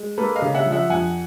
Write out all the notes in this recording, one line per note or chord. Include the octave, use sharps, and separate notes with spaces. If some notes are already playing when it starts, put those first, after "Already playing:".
Already playing: G#3
A#3 A4 B4
D#5 F5
C#3
E5 F#5
F3
E5 F#5
F2 F#5 G#5